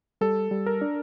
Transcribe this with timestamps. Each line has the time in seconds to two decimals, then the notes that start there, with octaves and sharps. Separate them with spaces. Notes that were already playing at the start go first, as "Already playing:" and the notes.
0.21 G3 A4
0.51 G3
0.66 A#4
0.81 D4